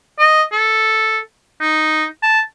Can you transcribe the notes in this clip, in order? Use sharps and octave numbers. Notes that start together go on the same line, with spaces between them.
D#5
A4
D#4
A5